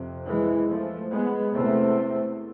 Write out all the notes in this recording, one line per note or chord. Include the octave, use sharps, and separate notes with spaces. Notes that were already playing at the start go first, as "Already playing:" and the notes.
Already playing: F2 C3
E3 G#3
F3 A3
G#3 B3
E2 C3 A3 C4